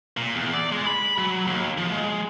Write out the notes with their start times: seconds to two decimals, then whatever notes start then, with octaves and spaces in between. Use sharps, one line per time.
0.17 A#2
0.35 E2
0.54 D5
0.72 G#3
0.86 B5
1.18 F#3
1.47 D#2
1.78 F3
1.92 G#3